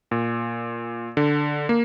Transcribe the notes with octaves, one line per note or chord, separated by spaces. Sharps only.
A#2
D3
A#3